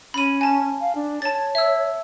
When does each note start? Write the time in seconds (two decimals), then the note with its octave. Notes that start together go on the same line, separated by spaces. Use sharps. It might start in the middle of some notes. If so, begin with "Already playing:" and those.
0.14 C#4 B5 D#7
0.41 G#5 A5
0.81 F5
0.95 D4
1.22 C#5 A5 A6
1.55 E5 E6